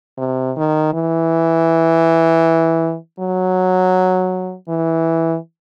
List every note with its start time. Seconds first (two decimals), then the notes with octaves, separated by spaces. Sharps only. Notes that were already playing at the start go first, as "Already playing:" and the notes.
0.18 C3
0.57 D#3
0.94 E3
3.20 F#3
4.69 E3